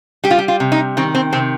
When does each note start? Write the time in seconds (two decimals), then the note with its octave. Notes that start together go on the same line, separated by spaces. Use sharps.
0.24 G3 G4
0.31 F4
0.39 G4
0.48 F4
0.60 C3
0.72 D#4
0.97 D#3 C4
1.15 C4
1.33 C3 C4